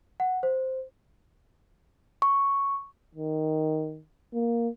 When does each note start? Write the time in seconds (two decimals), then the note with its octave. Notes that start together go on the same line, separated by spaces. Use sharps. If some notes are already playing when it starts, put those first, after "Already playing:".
0.20 F#5
0.43 C5
2.22 C#6
3.15 D#3
4.33 A#3